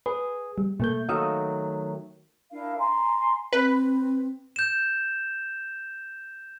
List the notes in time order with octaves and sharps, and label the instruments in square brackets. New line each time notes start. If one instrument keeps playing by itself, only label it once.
[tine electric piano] G#4 [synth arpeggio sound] B4
[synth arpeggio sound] G3
[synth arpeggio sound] B2 A#3 G6 [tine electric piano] A3
[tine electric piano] D#3 F#3 A3 [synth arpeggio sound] F5 D#6 E6
[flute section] D4 E4 A#4 F5
G#5 A#5 C6
[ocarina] C4 [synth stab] B4
[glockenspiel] G6 E7